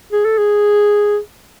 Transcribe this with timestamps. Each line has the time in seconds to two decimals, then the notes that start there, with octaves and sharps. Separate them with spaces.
0.12 G#4
0.25 A4
0.38 G#4